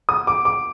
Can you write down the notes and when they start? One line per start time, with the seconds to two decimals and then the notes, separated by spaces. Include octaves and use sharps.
0.09 D#6
0.27 D6
0.45 D6